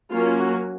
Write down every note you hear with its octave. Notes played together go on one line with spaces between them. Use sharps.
F#3 A#3 C#4 F4
F#4